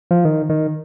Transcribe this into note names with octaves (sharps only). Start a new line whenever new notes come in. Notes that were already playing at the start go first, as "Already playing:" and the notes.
F3
D#3
D#3